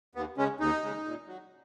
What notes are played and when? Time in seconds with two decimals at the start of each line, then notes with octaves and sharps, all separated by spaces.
0.15 D#2 B3
0.37 C#3 G#3 C#4
0.60 D#2 D#4
0.83 C#3 G#3
1.05 A#2
1.27 F#3